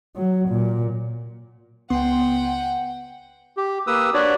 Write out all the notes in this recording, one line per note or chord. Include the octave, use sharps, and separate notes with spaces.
F#3
A#2
C#2 B3 F#5 G5 C6
G4
A#3 G4 B4 D#6 E6
D4 F#4 B4 C#5 D5